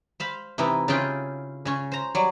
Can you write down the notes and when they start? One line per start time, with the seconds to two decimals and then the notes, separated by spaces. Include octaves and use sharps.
0.20 C5 F5 B5
0.58 C3 E3 D#4 E4
0.88 C#3 E4 F4 G#4 G5
1.65 C#3 C#4
1.92 C5 A#5
2.15 F#3 G3